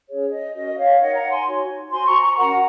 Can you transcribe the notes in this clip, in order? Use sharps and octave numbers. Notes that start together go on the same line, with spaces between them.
C#4 G#4 C#5
D#5
C#4 F#4 A#4 D#5
C#5 F5
D#4 A#4 C#5 D#5 F#5
F#5 A#5
G#5 C6
D#4 F#4 C#5
F#4 C5 G#5 C6
A#5 C#6
A#5 C#6
C#4 F#4 A#4 F#5 A#5